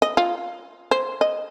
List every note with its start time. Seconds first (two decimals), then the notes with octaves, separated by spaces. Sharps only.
0.02 D#5
0.17 F4
0.91 C5
1.21 D#5